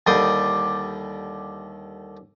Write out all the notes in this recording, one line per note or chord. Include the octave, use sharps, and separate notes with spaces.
D#2 D3 G3 D5 C6 D#6